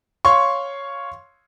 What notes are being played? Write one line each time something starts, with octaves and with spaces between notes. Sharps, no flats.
C#5 F5 C6 C#6